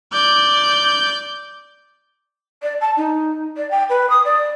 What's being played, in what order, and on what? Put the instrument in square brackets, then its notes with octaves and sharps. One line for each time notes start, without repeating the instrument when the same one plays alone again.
[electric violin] D5 G6
[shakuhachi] D5
A5
D#4
D5
G5
B4
D#6
D5